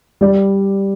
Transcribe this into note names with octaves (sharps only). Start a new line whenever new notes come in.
G3 D5